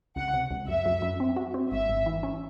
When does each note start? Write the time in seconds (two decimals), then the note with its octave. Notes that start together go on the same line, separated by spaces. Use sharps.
0.16 C#2 F#5
0.34 C3
0.51 C#2
0.68 F#2 E5
0.86 F#2
1.02 F#2
1.20 C4
1.36 F#4
1.54 C4
1.71 G#1 E5
1.89 G#1
2.06 E3
2.23 C#4